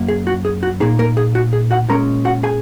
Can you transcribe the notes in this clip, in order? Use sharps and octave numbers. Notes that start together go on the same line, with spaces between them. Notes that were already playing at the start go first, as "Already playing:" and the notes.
Already playing: F#2 A#3
G#4
F#4
G#4
F#4
A#2 A#3 D#4 G#4
A#3 A#4
G#4
F#4
G#4
F#4 F#5
A#2 G#3 C#4 A#4 A#5
F#4 F#5
G#4 G#5